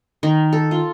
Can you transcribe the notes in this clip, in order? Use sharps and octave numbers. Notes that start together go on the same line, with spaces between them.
D#3
A4
F4